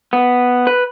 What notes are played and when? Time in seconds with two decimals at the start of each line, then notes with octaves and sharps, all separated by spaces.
0.13 B3
0.67 B4